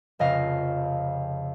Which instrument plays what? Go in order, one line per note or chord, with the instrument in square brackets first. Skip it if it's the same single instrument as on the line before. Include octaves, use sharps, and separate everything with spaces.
[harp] F1 F2 C#3 D#5 F5